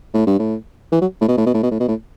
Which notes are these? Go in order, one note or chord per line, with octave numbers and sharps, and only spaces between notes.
A2
G2
A2
E3
F#3
A2
B2
A2
B2
A2
B2
A2
B2
A2